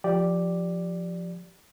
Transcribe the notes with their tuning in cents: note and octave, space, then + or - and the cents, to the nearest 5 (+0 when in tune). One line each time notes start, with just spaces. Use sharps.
F3 +0 G4 +0 D5 +0